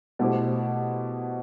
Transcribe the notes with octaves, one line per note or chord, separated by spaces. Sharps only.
B2 A3 E4 G4 C5